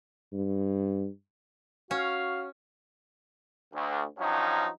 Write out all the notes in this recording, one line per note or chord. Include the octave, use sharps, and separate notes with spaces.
G2
C#4 F#4 F5
D2
G2 F3 F#3 C#4 D#4